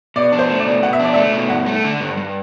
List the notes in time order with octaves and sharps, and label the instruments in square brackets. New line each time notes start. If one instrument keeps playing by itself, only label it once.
[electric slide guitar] B2 [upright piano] D5
[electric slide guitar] D4
[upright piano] C5
[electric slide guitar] A3
[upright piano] D5
[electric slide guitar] B2
[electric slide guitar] B2 [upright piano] F#5
[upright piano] E5
[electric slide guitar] D4 [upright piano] D5
[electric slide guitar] A3 [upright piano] E5
[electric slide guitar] B2
[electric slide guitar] G2 [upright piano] F#5
[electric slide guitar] A3
D3
G2
G2